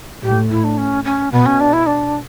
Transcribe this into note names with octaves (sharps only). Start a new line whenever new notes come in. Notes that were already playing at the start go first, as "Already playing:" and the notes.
A2 G4
E4
D4
C#4
C#4
B2 B3
C#4
D4
E4
D4